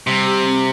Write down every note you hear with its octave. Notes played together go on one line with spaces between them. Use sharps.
C3 G3
G4
C4